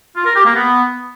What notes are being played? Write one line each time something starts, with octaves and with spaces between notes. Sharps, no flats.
F4
A#4
G4
A#3
B3